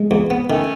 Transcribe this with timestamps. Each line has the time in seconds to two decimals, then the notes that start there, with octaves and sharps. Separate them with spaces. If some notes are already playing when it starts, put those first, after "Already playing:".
Already playing: G#3
0.11 E2
0.30 B3
0.49 D#3 A3 C#4